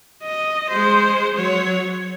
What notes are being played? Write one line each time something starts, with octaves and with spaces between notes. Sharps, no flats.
D#5
G#3 C5
F#3 C#5